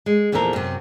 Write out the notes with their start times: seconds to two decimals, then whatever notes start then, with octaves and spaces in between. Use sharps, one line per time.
0.06 G#3
0.32 E2 A#2 F3 A4 A#4
0.53 F#2 C3